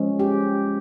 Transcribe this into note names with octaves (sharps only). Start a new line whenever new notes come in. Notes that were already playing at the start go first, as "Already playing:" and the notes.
Already playing: F3 G#3 C#4
G4